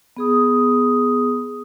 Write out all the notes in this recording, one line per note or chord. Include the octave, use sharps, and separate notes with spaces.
B3 G#4 D#6